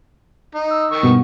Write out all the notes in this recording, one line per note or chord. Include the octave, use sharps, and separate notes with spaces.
D#4
E6
D#3 C#6
G2 B2 B3